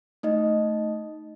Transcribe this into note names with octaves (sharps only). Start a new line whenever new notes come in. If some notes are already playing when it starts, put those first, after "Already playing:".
A3 D#4 D#5